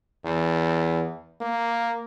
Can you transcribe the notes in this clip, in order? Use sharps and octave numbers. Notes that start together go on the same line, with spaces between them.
E2
A#3